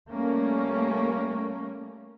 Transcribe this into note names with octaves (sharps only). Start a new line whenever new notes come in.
G3 A3 A#3 C#4